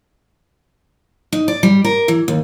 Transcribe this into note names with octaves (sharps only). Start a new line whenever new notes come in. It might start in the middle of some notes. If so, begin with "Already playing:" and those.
D#4
D5
G3
A#4
E3
D#2